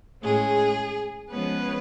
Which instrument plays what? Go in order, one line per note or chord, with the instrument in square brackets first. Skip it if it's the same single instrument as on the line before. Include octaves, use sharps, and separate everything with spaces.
[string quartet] A2 G#3 C#4 G#4
F3 G#3 B3 C#4 B4